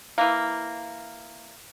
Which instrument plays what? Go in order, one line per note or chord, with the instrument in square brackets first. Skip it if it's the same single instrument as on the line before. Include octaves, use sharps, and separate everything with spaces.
[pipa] E3 A#3